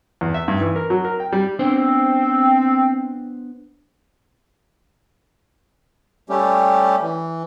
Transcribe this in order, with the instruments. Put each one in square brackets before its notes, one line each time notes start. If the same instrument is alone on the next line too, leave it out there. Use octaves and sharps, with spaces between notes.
[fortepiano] E2
E5
G2
E3
A#4
F#3
A#4
G5
G3
[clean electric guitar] B3 D4 C5 [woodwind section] C4
[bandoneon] G3 A3 C#4 G4
E3